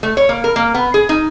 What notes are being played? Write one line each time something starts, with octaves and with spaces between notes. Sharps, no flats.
A3
C#5
A#3
A#4
A#3
B3
G#4
D#4